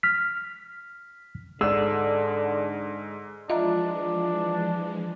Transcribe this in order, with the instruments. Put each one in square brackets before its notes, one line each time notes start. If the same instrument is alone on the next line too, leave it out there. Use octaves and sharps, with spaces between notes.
[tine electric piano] F6 B6
[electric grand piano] G#2 [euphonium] D3 [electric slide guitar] G#4 D5 [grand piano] E6
[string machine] E3 F3 G#3 [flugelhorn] D4 [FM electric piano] F4 [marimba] D#5 E5 A#5